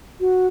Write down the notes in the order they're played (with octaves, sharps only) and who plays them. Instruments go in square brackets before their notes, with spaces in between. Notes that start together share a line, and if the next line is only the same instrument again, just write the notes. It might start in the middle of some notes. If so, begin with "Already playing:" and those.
[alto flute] F#4